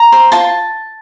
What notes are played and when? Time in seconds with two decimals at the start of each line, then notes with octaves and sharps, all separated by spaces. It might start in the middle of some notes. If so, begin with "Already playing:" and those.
Already playing: A#5
0.12 C5
0.32 F4 A5